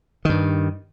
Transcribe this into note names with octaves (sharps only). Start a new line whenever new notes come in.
G2 D#3